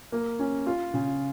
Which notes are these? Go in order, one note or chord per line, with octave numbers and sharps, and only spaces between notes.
A#3
C#4
F4
C#3